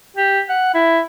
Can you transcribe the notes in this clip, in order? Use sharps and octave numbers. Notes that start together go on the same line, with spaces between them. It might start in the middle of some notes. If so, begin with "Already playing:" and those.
G4
F#5
E4